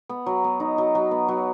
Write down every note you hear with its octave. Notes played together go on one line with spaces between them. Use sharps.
B3
F#3
B3
D#4
F#3
F#3
B3
F#3